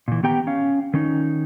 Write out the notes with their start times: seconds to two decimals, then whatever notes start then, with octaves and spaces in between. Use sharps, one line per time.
0.08 A#2 E3
0.23 D#3 B3 G4 G5 A#5
0.47 C#4 F5
0.94 D#3 C#4 D#4